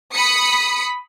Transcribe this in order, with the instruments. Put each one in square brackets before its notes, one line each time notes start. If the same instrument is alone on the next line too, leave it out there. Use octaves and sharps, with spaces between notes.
[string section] B5 D#6 B6 C#7